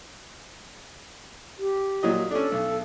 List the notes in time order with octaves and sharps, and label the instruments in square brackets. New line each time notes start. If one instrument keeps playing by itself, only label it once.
[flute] G4
[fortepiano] A#2 F#3 D#5
[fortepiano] C#4 D4 [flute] A4
[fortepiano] B1